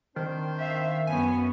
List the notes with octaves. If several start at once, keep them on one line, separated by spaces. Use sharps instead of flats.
D#3 C4 D4 C5
E5 F5
F#2 B3 C#4 G#5